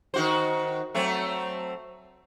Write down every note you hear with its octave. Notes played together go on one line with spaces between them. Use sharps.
D#3 F#4 C5
F#3 A3 C4